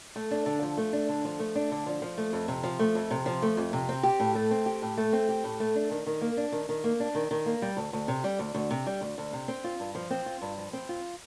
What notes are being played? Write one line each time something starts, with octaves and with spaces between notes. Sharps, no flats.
A3
D4
D3
F3
A3
D4
D3
F3
A3
D4
D3
F3
F3
A3
F2
C3
F3
A3
F2
C3
F3
A3
F2
C3
C4
G4
A2
A3
C4
G4
A2
A3
C4
G4
A2
A3
D4
D#3
D#3
A#3
D4
D#3
D#3
A#3
D4
D#3
D#3
A#3
G3
D2
D2
C3
G3
D2
D2
C3
G3
D2
D2
C3
C4
F4
G2
F3
C4
F4
G2
F3
C4
F4